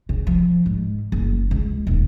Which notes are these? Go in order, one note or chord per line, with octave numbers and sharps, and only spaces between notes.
C#3
F3
G#2
F#1
C#2
D#1